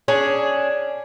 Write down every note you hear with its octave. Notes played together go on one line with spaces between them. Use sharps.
C#4 D4 G#4